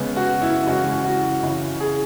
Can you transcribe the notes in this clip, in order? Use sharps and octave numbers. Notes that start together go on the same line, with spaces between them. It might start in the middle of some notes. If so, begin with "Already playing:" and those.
Already playing: C#3 G#3 B3
F#4
E4
C#3 E3 G#3 F#4
F#4
C#3 E3 C#4
G#4